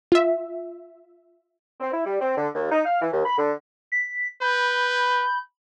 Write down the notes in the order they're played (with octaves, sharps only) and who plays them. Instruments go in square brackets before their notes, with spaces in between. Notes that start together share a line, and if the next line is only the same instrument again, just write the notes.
[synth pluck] F4 E5
[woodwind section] C4
E4
G3
C4
D3
D#2
D#4
F5
E3
D#2
B5
D3
[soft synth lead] B6
[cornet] B4 [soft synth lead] B5 [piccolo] G6